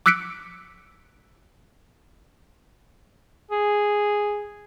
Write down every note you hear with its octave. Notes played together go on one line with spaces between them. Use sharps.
D6 E6 F#6 B6 C#7 D7
G#4